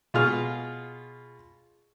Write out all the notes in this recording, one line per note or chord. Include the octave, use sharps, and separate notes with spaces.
B2 F4 G#4 F6